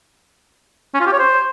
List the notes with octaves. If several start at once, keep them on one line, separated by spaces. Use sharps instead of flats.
C#4
F4
G4
C#5
C5